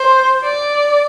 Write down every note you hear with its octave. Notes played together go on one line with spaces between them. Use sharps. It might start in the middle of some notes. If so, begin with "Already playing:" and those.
Already playing: C5
D5